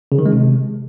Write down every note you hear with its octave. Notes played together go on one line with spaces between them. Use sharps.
C#3
D#3
G#3
C3